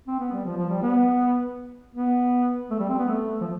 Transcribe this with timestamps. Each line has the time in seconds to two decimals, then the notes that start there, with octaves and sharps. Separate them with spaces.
0.07 C4
0.20 B3
0.33 G3
0.45 F3
0.57 F3
0.69 G3
0.82 B3
1.95 B3
2.71 A3
2.80 G3
2.89 C4
2.99 B3
3.08 A3
3.41 F3